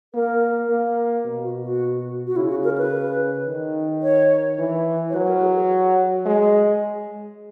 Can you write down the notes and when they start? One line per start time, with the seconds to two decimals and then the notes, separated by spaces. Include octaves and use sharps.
0.14 A#3 A#4
0.70 A#3
1.25 B2
1.44 F#4
1.63 F#4
2.27 F#4
2.36 C#3 E4
2.50 F#4
2.64 A#4
2.78 B4
3.47 D#3
4.03 C#5
4.59 E3
5.10 C#5
5.14 F#3 B4
5.28 A#4
5.42 G#4
5.56 G#4
6.25 G#3 G#4